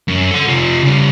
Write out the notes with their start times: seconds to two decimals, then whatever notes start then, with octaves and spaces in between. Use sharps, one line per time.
0.08 F#2
0.31 A4 F#5
0.48 C3 F4
0.83 C#3 G3